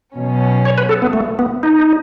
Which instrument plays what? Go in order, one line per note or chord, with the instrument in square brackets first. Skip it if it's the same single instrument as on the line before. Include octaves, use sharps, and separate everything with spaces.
[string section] B2 F#3 C#4
[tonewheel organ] C#5
B4
A4
B3
A3
B3
D#4